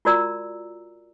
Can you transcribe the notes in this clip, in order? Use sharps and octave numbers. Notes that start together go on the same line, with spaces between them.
F4 F#4 A#4 D5 A#5 E6